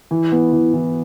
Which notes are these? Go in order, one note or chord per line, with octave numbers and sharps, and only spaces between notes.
E3
B3
E3
E3